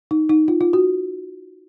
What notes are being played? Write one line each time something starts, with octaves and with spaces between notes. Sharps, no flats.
D#4
D#4
F4
F4
F#4